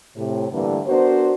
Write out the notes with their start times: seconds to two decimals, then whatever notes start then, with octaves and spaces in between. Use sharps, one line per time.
0.16 A2 C3
0.51 G2 D3 E3 G3 A3 A#3
0.87 B3 D4 F#4 A#4 C5